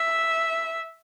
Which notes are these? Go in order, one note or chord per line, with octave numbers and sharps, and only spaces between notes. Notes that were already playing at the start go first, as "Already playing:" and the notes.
Already playing: E5